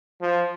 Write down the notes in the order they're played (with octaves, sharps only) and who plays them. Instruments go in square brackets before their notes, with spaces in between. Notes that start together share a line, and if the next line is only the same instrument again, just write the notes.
[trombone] F3